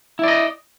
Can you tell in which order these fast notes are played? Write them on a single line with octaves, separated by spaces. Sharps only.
E4 D5 D#5